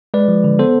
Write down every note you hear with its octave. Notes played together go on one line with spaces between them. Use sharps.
G#3 B4 D5
F3
D3
B3 A4 C5